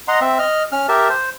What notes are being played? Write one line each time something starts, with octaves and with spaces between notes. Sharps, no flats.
D#5 F#5 A#5 C6
C4 E5
D#5 F6
C#4 F6
G4 A#4 E5 A5
C5